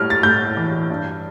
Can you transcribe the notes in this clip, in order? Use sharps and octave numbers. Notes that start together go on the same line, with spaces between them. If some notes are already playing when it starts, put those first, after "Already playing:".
Already playing: A2 G3 F6
A6
A2 G6
E3
G2